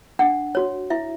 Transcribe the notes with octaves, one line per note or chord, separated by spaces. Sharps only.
D4 F#5
F#4 C#5
E4 E5